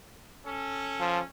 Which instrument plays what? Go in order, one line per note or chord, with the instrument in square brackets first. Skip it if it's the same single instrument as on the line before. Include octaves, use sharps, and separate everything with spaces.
[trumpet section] C#4 A4
[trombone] F3